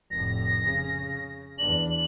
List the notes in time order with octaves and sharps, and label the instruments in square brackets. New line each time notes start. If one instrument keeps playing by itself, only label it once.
[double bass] F1 A2 [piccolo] A#6
[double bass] C#3
[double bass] E2 D4 [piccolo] F#7